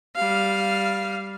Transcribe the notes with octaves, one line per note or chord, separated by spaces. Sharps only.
G3 F5